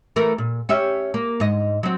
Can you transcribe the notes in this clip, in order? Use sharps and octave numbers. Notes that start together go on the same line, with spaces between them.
E3 A3 A#4
A#2
C#4 G4 E5
A#3
G#2 D#5
F#3 C4